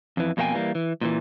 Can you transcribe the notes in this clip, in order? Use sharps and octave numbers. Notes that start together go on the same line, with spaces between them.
F2 E3
F2 B2 A#3 F4 G5 G#5
E3 G3 A#3
E3
A#2 D3 E3